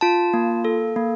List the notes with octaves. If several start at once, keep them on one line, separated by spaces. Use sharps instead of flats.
F4 A5
A#3
A4
A#3